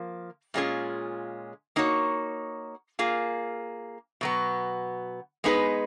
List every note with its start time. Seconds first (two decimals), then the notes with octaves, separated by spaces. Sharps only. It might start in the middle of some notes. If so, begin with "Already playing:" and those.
Already playing: F3 A#3
0.54 A#2 G#3 C#4 F4 G#4
1.76 A#3 D#4 F#4 C#5
2.99 A#3 F4 G#4
4.21 B2 F#3 B3
5.44 G#3 B3 D#4 G#4 B4